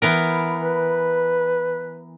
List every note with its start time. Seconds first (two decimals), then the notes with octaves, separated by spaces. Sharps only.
0.02 E3 B3 A#4
0.62 B4